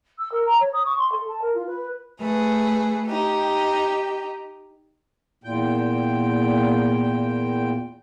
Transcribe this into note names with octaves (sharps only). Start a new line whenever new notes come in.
E6
A#4
A#5
C#5
D#6
C#6
C6
A4
A5
A#4
F4
B4
A3 G#4 B4
D#4 G4
E2 A#2 G5